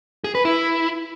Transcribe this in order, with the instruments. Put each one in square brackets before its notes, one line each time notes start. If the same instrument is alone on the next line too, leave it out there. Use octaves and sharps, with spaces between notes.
[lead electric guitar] G#4
B4
E4